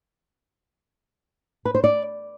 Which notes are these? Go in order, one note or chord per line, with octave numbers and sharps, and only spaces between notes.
B4
C5
D5